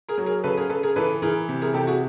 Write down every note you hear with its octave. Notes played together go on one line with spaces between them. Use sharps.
G#4 A#4
F#3
G#4 A#4
C#3 A4 B4
G#4 A#4
C#3 A4 B4
G#4 A#4
E3 A4 B4
E3 G#4 A#4
C3
G#4 A#4
C3 G4 A4
F#4 G#4